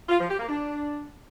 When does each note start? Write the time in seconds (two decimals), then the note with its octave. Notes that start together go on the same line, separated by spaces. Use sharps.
0.09 F4
0.19 F3
0.29 G4
0.39 A#3
0.49 D4